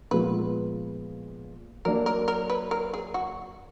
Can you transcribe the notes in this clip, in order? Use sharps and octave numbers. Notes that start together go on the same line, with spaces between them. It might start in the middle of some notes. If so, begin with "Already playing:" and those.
A#2 F3 G#3 B3 F4 B4
F#3 A#3 D4 A#4
A#4
A#4
B4
A#4
G#4
F#4